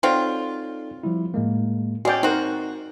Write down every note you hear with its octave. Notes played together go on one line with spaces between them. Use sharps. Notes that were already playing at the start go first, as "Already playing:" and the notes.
F#3 C4 D#4 F4 A4 D5
F3 G3 E4
A2 G#3 A#3
G#3 C#4 F#4 D5 G5 C7
C4 D#4 F#4 A#4